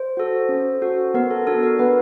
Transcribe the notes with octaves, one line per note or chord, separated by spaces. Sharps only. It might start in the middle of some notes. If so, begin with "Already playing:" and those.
Already playing: C5
F#4 A4
C#4
F#4 A4
B3 A#4
A4
D4 F#4 A4
A#4
B3 B4